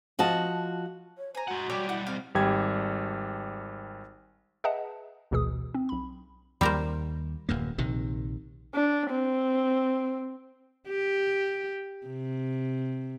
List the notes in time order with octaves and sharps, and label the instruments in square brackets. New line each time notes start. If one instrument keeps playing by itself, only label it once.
[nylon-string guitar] F3 F#4 D#5 A5
[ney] C#5
[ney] C5 [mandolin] G#5 A#5
[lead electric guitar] G#3 F#5 [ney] F#4
[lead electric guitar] B1 G3 [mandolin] C#5 D5 G5
[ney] E4 [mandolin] F#5
[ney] C4 [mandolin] F5
[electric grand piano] G#1 G3 G4 G#6
[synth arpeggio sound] G#4 B4 D#5 E5 F#5 A5
A1 D2 B2 E3 G#4 D#6
C4
B1 B5
[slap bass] D#2 [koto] G3 A#4 C5
[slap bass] D1 F#2 A#3
A#1 C3 D#3
[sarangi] D4
C4
[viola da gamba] G4
C3